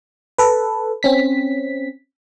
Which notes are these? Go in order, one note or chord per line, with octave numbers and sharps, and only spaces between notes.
A4 B4
C4 C#4 B6